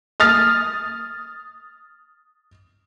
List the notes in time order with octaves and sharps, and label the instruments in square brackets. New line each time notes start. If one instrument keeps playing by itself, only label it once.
[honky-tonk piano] D#6 F6 A6